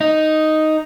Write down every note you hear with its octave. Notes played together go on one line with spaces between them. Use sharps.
D#4